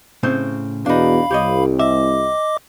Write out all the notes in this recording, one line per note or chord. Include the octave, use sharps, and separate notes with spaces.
A2 C#3 C4
E2 B2 D4 D#4 F5 B5
C2 G4 C#5 D#5
D#5 E5 D6